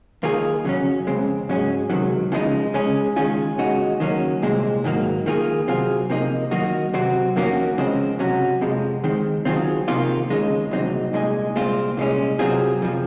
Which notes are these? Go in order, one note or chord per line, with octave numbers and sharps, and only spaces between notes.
D#2 D#3 A#3 F4 G#4
F2 C#3 F#3 C#4
F2 C#3 G#3 C4
G#2 F#3 C#4 G#4
C#2 C3 D#3 F#3
C#3 F3 G#3 C4 D#4
C#3 G#3 C#4 G#4
D#3 G#3 C#4 F4 G#4
D#2 C#3 G#3 D#4 F#4
D#3 F#3 A#3 C#4
C2 A#2 G#3 C4
G#2 D#3 F#3 A#3
D#3 A#3 F4 G#4
C3 F#3 C4 F4 G#4
C3 F3 A#3 D#4
D#3 F#3 A#3 D#4 F#4
C3 F#3 C4 F#4
F2 D#3 A#3 C#4 F#4
C#3 F3 G#3 C4
C3 F#3 C#4 F#4
F2 C3 F3 G#3
D#3 G#3 C4
D#3 F#3 C4 F4 G#4
C3 D#3 A#3 F4
D#2 C#3 G#3 D#4
C2 A#2 F#3 C4 D#4
C2 A#2 G#3 D#4 G#4
C2 A#2 G#3 C4 F4
C2 A#2 G#3 C#4
C3 F#3 C4 F4 G#4
F2 C3 F3